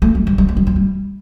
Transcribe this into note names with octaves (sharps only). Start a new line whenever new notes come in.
A3
G3
G3
G3
A3
G3
F3
G3